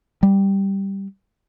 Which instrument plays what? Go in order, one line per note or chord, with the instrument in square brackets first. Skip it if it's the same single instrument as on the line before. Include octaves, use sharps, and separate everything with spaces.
[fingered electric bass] G3